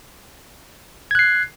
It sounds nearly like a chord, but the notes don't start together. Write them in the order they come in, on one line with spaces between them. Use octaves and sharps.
G#6 F#6 C7